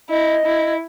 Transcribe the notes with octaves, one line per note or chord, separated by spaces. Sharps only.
E4 D#5
E4